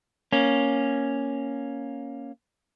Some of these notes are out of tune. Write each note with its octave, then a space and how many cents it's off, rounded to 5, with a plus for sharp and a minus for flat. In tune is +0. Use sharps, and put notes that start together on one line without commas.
A#3 +10 C#4 +0